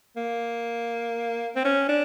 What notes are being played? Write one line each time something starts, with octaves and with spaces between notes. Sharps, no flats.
A#3
C4
C#4
D4